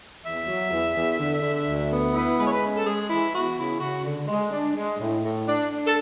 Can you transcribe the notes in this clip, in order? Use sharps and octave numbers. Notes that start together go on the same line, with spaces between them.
E2 E5
F#3
E2
E2
D3
D3
D2
B3
E4 B4
G#3 B4
C#5
B4
C#4
A4
G#3 G#4
E3 E4
B3 F#4
C#3 E4
C#3 F#4
D3
G#3
D4
G#3
A2
A2
D4
D4
A4